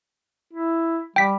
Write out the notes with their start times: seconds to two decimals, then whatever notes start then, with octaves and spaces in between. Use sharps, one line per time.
0.53 E4
1.16 G3 G5 B6